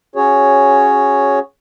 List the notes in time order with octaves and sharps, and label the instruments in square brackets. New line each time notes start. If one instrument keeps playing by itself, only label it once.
[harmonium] C#4 F#4 G#4 C#5